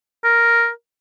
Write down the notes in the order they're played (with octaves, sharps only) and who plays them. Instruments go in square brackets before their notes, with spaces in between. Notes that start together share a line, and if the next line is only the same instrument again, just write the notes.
[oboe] A#4